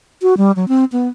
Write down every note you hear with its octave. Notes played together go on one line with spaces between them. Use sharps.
F#4
G3
F#3
C4
B3